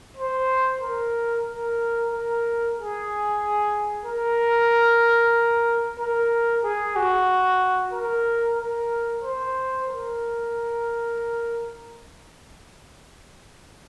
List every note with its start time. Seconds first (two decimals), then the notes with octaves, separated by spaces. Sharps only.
0.17 C5
0.81 A#4
1.47 A#4
2.11 A#4
2.76 G#4
4.06 A#4
5.99 A#4
6.64 G#4
6.96 F#4
7.93 A#4
8.58 A#4
9.22 C5
9.87 A#4